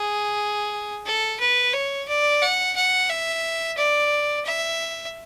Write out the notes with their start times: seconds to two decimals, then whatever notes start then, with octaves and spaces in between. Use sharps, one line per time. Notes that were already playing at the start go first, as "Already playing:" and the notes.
Already playing: G#4
1.06 A4
1.40 B4
1.74 C#5
2.08 D5
2.42 F#5
2.76 F#5
3.10 E5
3.78 D5
4.45 E5